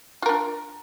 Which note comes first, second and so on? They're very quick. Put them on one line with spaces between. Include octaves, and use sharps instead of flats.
F4 A#4 D4